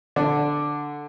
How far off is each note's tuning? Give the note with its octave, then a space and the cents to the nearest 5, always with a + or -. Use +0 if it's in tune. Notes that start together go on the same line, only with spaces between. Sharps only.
D3 +0 D4 +0